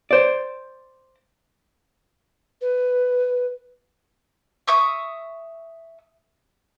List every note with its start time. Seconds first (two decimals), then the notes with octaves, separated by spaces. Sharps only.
0.11 C5 D5
2.61 B4
4.67 E5 C#6 D#6 E6